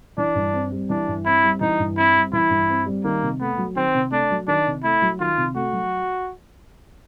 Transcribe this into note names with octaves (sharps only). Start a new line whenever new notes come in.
E3 D4
G2
C4
G3
E3 D4
G2
C4 E4
G3
E3 D#4
G2
C4 E4
G3
E3 E4
G2
C4
G3
D#3 A#3
C3
A3 B3
F#3
D#3 C4
C3
A3 D4
F#3
D#3 D4
C3
A3 E4
F#3
D#3 F4
C3
A3 F#4
F#3